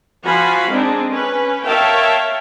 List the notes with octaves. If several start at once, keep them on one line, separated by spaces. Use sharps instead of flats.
F3 F#4 F5 G#5 B5
G#3 C4 D4 D#4 G#4
C#4 B4
A#4 C#5 E5 F5 G5 A5